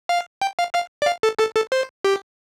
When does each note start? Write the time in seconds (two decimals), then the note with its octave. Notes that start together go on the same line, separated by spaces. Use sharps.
0.09 F5
0.42 G5
0.59 F5
0.75 F5
1.02 D5
1.06 F5
1.23 A4
1.39 A4
1.55 A4
1.72 C5
2.04 G4